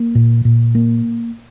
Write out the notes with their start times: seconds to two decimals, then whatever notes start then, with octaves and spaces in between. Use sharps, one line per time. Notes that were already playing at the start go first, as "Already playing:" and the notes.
Already playing: A#3
0.15 A#2
0.45 A#2
0.75 A#3